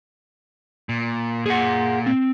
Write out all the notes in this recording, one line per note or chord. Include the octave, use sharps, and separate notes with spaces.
A#2
A#2 G#4 F#5
C4